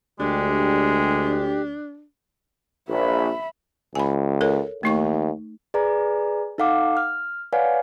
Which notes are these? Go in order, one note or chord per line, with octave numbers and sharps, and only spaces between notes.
D2 G#3 D4 G4
A#1 E5 B5
C#2 G#5 B5
A4 A#4 C#5
D#2 A3 D#4 C#6
G#4 B4 D5 G#5 A#5
D#4 A4 F5 F#5 D6
F6
B4 C#5 D5 F5 F#5 G#5